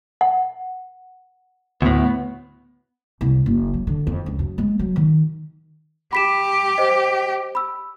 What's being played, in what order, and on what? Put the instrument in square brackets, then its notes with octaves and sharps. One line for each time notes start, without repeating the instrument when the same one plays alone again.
[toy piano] F#5
[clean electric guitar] D2 A2 [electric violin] B3
[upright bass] C2
F#1
F#3
D3
F2
C#2
F#2
G#3
F#3
D#3
[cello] G4 [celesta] B5 B6 E7
[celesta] C5 D#5
B5 E6